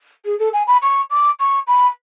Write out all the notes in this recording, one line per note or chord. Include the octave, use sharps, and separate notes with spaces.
G#4
A4
G#5
B5
C#6
D6
C#6
B5